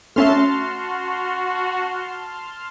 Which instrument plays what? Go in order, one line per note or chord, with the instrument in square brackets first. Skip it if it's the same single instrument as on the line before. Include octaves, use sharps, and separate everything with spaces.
[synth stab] A3 C#4 E5 [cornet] F#4 [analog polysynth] A5 C6 F6